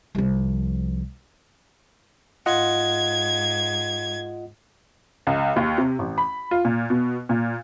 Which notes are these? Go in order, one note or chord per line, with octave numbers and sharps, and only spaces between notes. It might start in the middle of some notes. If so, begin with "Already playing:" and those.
C2 F3
G#2 F4 D#5 F#5 G#6
C#2
D#2
C3
A1
B5
F4
A#2
B2
A#2